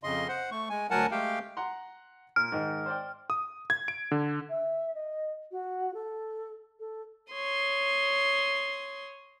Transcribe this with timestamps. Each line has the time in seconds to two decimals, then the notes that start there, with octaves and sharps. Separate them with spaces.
0.03 F2 C#3 D#5 C6
0.28 C5 F#5
0.51 A3 C#6
0.70 G#3 G#5
0.90 D2 F#3 A#4 F#5 G#5 A5
1.11 G#3 A3 G4 F5 G5
1.57 F#5 A#5 C6
2.36 A#2 F6
2.52 G#2 D#3
2.86 C5 D5 G5
3.30 D#6
3.70 G#6
3.88 D7
4.11 D3
4.49 E5
4.95 D#5
5.52 F#4
5.94 A4
6.80 A4
7.33 C#5 C6 D#6